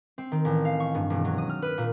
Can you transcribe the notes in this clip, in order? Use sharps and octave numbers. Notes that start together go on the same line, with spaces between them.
C4
D#3
A1
F5
C#6
G2
E1
F#3
D#6
F6
B4
A#2